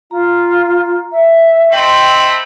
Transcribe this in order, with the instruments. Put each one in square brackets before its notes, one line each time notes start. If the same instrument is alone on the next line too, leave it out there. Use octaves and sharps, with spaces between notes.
[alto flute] F4 [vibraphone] A#5
[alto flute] E5
[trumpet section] A3 C4 B5 [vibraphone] D#5 C6 [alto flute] G5